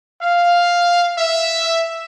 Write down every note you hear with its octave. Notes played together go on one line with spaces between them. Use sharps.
F5
E5